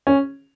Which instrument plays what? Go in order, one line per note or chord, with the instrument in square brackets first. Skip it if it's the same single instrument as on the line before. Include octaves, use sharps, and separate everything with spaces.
[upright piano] C#4